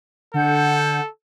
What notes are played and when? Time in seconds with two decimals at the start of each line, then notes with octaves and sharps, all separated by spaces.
0.34 D3 A4 F#5 G6